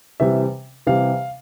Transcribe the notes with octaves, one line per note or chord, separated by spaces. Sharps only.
C3 E3 G3 E5
C3 E3 G3 F5